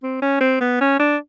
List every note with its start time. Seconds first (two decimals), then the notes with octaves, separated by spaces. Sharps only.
0.03 C4
0.22 C#4
0.41 C4
0.61 B3
0.81 C#4
0.99 D4